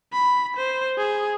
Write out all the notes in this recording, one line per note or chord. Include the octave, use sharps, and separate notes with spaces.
B5
C5
G#4